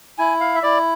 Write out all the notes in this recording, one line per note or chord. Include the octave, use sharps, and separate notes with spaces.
E4 G#5
F5
E5
E4 D5